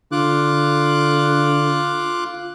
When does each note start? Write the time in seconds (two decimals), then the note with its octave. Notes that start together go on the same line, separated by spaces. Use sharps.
0.12 D3 F4 D6 F#6